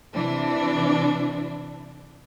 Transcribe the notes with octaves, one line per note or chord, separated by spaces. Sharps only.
C3 E3 D4